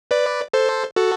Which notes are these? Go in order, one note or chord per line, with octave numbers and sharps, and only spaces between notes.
B4 D5
A4 C5
F#4 A4